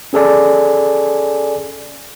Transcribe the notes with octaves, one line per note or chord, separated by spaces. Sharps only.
C#4 G#4 A4 D5 G#5